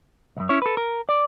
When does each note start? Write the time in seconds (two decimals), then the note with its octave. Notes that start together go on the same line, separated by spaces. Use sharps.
0.37 B1 F#2
0.49 C#4 E4 C#5
0.62 A4 B4
0.77 A#4
1.09 D5